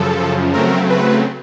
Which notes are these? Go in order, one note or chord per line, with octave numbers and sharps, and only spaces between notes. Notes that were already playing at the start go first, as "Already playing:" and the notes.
Already playing: F#2 C#3 F3 A4
C#3 F#3 A3 C4 A#4
B4